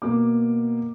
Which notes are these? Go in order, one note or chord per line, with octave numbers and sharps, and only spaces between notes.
B2 A#3 D6